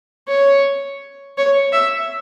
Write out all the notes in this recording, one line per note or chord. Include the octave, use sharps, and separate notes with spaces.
C#5
C#5
E5